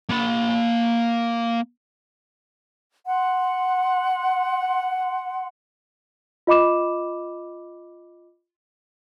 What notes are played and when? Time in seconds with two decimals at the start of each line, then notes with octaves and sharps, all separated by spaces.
0.09 A#3 B5
3.06 F#5 C6
6.47 F4 D#5 B5 D6 E7